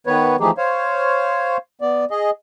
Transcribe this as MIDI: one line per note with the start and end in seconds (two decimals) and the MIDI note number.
0.07 0.36 51
0.07 0.36 59
0.07 0.36 71
0.07 0.36 73
0.40 0.51 52
0.40 0.51 53
0.40 0.51 57
0.40 0.51 63
0.40 0.51 67
0.40 0.51 68
0.58 1.57 72
0.58 1.57 73
0.58 1.57 77
1.81 2.05 59
1.81 2.05 74
2.11 2.31 68
2.11 2.31 75